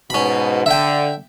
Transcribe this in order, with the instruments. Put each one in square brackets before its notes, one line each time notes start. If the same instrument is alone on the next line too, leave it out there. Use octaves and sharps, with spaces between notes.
[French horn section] G#2 B2 [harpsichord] C#4 B5
[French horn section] D3 [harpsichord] E5 G5